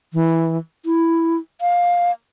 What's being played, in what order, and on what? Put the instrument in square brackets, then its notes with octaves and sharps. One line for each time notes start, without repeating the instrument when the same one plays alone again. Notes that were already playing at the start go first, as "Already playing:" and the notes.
[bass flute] E3
E4
F5